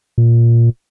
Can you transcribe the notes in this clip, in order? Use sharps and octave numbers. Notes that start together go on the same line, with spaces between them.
A#2